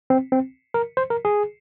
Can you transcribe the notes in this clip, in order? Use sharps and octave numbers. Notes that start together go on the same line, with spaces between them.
C4
C4
A#4
C5
A#4
G#4